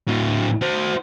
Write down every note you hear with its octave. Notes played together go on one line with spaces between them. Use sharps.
A2 F#3
F#4 C5